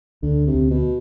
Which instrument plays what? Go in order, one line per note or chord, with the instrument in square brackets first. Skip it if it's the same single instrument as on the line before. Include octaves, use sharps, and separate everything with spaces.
[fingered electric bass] D2 [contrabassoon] D3
[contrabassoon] C3
[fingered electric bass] D2
[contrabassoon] B2